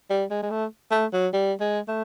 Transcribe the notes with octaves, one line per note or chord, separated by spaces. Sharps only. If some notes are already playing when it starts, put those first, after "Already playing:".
G3
G#3
G#3
A3
A3
F#3
G3
G#3
A3